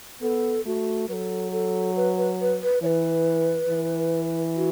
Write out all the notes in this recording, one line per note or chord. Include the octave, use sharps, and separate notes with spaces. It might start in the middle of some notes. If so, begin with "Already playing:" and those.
B3 A4
A3 F#4
F#3 A4 B4
A4
B4
B4
B4
B4
E3 B4 C#5
E3
F#4